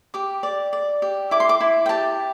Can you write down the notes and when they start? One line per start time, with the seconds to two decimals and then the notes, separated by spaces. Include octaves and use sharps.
0.14 G4 D6
0.43 D5
0.73 D5
1.02 G4
1.31 E4 D6
1.40 C6
1.49 D6
1.61 E4
1.86 G5
1.89 G4 A5